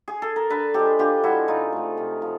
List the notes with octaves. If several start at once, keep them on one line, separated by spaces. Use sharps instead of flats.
G#4
A4
A#4
D3 A4 B4
F3 G#3 G4 A4
D3 F4 G4
F3 G#3 E4 F#4
C3 D#4 F4
F3 A3
C3
F3